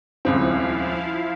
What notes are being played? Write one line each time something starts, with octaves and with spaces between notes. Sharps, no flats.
D#1 C#2 F3 C4 E4 F5